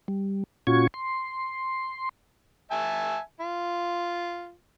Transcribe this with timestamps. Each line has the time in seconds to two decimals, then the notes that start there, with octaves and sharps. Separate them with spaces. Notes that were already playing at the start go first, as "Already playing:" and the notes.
0.08 G3
0.67 A#2 C#4 F4 F#4 C#6 G#6
0.94 C6
2.71 E5 G#5 A5
3.40 F4